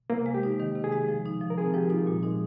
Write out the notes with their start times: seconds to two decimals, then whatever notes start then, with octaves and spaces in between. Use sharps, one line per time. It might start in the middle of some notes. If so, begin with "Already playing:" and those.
0.10 C3 A#3
0.26 G#3
0.34 G4
0.43 D#4
0.60 D#3
0.75 C3
0.84 G#4
0.92 G#3
1.08 F3
1.26 D#4
1.41 F3
1.50 A#4
1.58 C4 G#4
1.74 F3 G4
1.90 D#4 F4
2.07 A#2 G#3
2.23 G#3 D#4